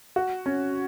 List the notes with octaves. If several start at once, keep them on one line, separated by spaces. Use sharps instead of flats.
F#4
C#4